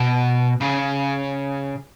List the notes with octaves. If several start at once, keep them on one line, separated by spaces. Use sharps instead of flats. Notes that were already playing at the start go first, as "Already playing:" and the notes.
Already playing: B2
C#3